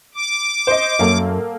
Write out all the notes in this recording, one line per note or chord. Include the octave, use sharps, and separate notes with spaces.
D6
C5 D#5
F#2 A#3 A4